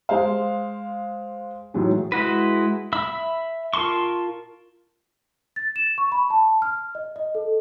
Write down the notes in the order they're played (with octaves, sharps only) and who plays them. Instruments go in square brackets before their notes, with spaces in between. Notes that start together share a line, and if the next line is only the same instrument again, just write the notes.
[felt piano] G#3 C5 F5
A2 D#3 E3 F#3 G#3
[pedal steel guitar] G#3 E4 F#4 B4
E5 B5 E6
F4 A#4 A5 C6 C#6
[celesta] A6
E7
C#6
B5
A5
F6
D#5
D#5
A4